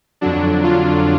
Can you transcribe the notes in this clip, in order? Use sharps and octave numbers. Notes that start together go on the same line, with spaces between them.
F2 D3 F#3 D4
F4